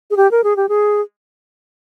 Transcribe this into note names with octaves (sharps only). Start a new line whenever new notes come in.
G#4
G4
A#4
G#4
G4
G#4